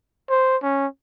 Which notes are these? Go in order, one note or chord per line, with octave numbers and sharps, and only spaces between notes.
C5
C#4